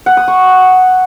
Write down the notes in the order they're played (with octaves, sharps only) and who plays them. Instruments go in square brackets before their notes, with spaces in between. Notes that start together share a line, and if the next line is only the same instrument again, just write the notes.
[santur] F#5
D#6
C#6